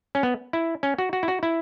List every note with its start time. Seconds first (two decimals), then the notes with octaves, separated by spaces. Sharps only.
0.15 C#4
0.23 B3
0.53 E4
0.83 C#4
0.98 F#4
1.13 F#4
1.23 E4
1.28 F#4
1.43 E4